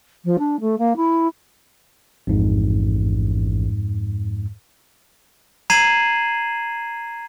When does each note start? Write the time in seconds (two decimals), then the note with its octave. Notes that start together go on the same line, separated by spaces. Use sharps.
0.25 F3
0.39 D4
0.61 A3
0.78 A#3
0.97 E4
2.27 A1 F2 G#2
5.70 A#5 G#6 C7 D#7 E7 F#7